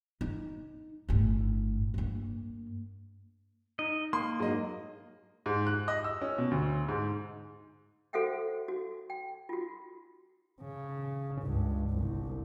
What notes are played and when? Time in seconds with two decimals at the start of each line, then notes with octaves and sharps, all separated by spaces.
0.21 D#4
1.09 G1 A2
1.94 G2 A#3
3.79 D#4 D#5
4.13 A#3 C6
4.40 G#2 F#3 D#5
5.46 G#2
5.67 F#6
5.88 D#5
6.04 E6
6.21 C#4
6.38 B2
6.51 D2
6.88 G#2
8.13 F#4 A4 C5 E5 F#5 G5
8.68 F#4
9.10 G5
9.49 F4 F#4
10.62 C#3
11.42 C#2 G2
11.90 G1 C2